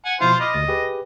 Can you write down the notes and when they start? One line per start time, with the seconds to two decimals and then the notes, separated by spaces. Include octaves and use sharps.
0.05 F#5 G#5
0.21 B2 F3 E4 F4 C5
0.40 D#5 B5 D6 F6
0.53 D2 A6 A#6
0.68 G4 G#4 B4